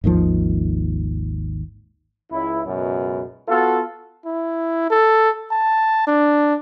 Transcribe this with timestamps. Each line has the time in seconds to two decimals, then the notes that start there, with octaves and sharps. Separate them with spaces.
0.04 G#1 D#2 D#3 F3
2.31 C#2 E4
2.64 C#2 F#2 B2
3.48 B3 F4 F#4 A4
4.26 E4
4.90 A4
5.51 A5
6.07 D4